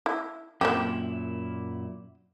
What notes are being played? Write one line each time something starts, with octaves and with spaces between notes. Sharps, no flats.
E4
F#2 A#2 A#3 C4 E4 G4